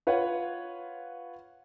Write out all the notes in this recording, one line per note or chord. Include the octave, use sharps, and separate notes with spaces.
F4 B4 C#5 F#5